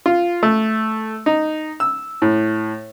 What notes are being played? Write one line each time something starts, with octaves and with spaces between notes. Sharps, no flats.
F4
A3
D#4
E6
A2